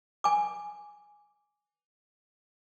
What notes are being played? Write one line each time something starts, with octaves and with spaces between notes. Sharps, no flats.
G#5 D6